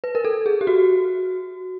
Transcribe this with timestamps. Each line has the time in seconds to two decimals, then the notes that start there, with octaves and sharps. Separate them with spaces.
0.04 B4
0.15 A#4
0.25 A4
0.46 G#4
0.61 G4
0.67 F#4